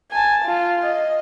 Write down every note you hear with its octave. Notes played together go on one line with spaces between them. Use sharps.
G#5 A5
F4
D#5